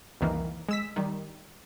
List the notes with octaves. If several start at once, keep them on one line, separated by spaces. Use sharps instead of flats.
C2 F2 D#3 E3 A#3
G#3 E6 B6
D#3 G3